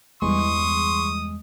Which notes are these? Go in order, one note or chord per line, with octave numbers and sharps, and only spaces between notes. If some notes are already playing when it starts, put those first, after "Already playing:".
E2 G2 G3 G#3 C6 C#6 D#6